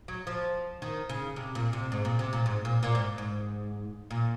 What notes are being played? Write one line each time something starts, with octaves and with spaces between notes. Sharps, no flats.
F#3
F3
D#3
C#3
C3
A#2
C3
G#2
A#2
C3
A#2
G#2
A#2
A#2
G#2
G#2
A#2